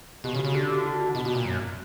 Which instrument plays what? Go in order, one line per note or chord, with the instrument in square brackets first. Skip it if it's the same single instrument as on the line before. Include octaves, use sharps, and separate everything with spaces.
[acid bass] B2 [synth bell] G4
[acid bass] C#3
[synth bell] F#4
[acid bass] C#3
[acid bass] D3 [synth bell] G4
[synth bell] F#4
F#4
F#4
[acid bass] B2 [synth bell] F#4
[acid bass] B2
A#2
F#2